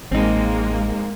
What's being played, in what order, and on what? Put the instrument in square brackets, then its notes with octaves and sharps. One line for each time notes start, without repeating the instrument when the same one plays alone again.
[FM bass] A1 [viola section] G#3 A#3 [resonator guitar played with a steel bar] C4 D#4